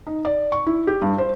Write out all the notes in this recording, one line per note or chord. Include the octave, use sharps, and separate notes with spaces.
D#4
D5
C#6
E4
G4
G2
C5